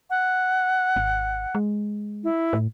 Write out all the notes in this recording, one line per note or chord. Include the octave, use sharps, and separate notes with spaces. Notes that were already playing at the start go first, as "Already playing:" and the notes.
F#5
G#1
G#3
E4
A2